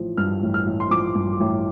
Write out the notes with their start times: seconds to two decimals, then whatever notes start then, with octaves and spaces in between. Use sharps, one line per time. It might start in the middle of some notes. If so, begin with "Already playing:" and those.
Already playing: A1 F3
0.17 G2 F6
0.43 A1
0.54 F6
0.66 A1
0.80 C6
0.91 F3 D6
1.15 G2
1.40 A1